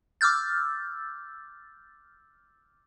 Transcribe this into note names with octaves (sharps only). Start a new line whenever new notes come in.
D6 E6 F6 G6 A6